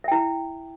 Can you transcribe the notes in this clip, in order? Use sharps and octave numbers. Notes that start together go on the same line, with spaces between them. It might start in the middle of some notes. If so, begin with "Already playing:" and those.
E4 E5 G5